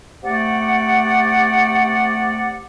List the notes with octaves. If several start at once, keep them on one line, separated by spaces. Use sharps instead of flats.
C3 A3 D5 F#5